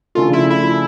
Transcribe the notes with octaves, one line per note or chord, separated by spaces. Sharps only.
C#3 F3 A3 D4 F4 A4
E4
E4